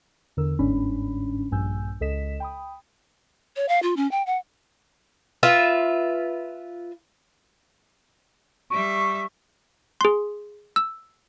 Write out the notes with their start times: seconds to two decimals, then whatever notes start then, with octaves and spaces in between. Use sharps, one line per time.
0.37 E2 D3 A#4 E6
0.59 G1 G#2 C#4 D4 B5
1.51 A#1 G2 G#5 E6 G6
2.01 C#2 A4 D#5 B6 E7
2.40 G5 B5 D#6
3.56 C#5
3.69 F5
3.83 F4
3.97 C#4
4.11 G5
4.26 F#5
5.43 F4 B4 E5
8.70 G3 E5 C#6
10.01 G#4 C6
10.76 E6